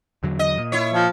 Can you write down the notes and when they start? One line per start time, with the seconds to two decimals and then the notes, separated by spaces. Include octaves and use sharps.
0.23 E2 D3 F#3
0.39 D#5
0.58 A#2
0.72 E4 C#5
0.93 F3